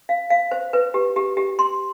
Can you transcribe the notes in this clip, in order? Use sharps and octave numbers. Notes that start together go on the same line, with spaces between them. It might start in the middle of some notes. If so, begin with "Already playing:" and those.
F5
F5
C5
B4
G4
G4
G4
C6